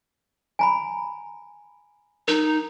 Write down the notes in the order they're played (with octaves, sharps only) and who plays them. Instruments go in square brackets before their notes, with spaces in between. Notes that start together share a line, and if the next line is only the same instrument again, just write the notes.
[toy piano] G#5 A#5 B5
[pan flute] D#4 [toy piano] A#4